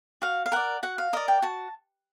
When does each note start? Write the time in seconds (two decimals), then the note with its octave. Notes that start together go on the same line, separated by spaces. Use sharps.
0.22 F#4 F5
0.46 F5
0.52 A#4 D5 F#5
0.83 F#4 F#5
0.98 F5
1.13 A#4 D5 D#5
1.28 G5
1.42 F#4 A5